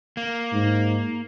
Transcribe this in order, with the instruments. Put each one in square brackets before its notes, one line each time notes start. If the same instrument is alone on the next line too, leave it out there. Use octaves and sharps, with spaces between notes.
[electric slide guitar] A#3
[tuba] G#2